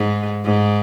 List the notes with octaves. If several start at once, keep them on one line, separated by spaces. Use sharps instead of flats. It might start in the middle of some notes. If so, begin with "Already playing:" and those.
Already playing: G#2
G#2